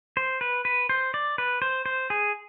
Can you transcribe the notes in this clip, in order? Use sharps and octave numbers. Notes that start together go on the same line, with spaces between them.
C5
B4
B4
C5
D5
B4
C5
C5
G#4